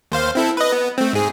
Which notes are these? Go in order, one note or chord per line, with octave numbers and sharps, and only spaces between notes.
D#2 C5 F5
C4 E4 A4
B4 D#5
B3
A3 C4
G#2 G#4